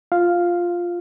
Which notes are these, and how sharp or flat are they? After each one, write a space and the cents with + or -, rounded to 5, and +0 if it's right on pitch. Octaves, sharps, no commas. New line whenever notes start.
F4 +0 F5 +0